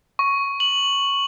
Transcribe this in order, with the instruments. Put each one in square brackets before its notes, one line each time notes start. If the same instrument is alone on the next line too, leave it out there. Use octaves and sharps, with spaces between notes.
[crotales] C#6
F#7